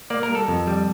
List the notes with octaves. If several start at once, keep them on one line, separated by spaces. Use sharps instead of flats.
A#3 D5
A#4
G3
A4
F2
G3